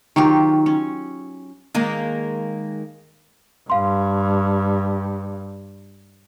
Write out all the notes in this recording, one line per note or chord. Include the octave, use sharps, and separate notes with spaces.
D#3 F#3 F4 G4
C#4
D#3 G#3 A#3
G2 F5 C6